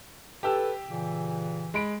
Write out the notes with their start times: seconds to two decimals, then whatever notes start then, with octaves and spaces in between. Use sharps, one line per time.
0.43 G4 A4 B4 G5 E6
0.89 A#2 C#3 E3
1.74 G#3 B5 D7